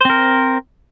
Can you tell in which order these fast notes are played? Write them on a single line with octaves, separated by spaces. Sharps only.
C5 C4 A#4